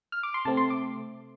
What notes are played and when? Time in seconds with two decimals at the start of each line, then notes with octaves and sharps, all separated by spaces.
0.12 F6
0.23 D6
0.34 C6
0.45 C3 A3 C4 A5
0.57 C6
0.70 D6